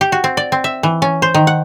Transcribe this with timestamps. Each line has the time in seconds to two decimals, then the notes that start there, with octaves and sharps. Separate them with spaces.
0.01 G4
0.12 F#4
0.24 C4
0.37 D5
0.52 C4
0.64 E5
0.83 E3
1.02 C#4
1.22 C5
1.34 D#3
1.47 F#5